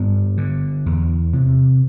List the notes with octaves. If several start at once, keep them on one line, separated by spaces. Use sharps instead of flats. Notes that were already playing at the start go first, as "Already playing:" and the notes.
Already playing: G2 B3
D3
E2
C3